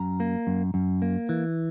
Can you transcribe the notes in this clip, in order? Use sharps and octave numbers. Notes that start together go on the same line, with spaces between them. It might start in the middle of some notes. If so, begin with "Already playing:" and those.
Already playing: F#2 A#5
A#3
F#2
F#2
A#3
E3